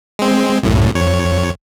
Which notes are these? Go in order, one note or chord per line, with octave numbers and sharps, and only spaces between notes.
G#3 C4
C2 F#2 A2
F2 C#5